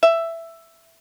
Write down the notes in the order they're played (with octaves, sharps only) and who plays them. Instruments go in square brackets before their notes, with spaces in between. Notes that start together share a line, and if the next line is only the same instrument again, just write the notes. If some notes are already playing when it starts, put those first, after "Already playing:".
[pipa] E5